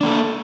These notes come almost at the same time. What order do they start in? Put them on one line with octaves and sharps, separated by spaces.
D4 A#3 A4